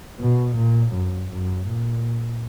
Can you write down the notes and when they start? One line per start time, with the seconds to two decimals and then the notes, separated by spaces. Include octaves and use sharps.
0.20 B2
0.57 A#2
0.93 F#2
1.31 F#2
1.68 A#2